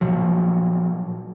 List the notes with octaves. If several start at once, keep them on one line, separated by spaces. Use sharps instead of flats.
A#2 F3 F#3